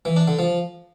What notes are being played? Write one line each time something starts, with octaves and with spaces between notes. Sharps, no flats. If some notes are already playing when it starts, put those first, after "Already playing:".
E3
D4
D3
F3